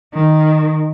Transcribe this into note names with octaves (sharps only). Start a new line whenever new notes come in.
D#3